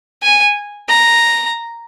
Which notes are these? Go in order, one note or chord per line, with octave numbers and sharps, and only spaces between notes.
G#5
A#5